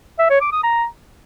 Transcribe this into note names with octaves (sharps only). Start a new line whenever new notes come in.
E5
C#5
D6
D#6
A#5